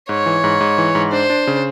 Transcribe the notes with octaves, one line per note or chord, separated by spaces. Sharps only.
G#2 C#5
E3
G#2
G#2
E3
G#2
D4 C5
D4
C#3